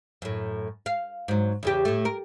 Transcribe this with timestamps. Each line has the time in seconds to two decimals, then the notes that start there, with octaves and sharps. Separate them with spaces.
0.22 F#2 A2
0.86 F5
1.28 G#2 F#3
1.63 E2 C#3 G4
1.85 A2 A3
2.05 A#4